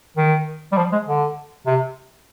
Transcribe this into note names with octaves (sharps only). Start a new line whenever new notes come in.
D#3
G3
F3
G#3
D3
C3